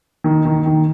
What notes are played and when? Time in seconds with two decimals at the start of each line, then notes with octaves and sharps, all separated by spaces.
0.24 D#3
0.45 D#3
0.66 D#3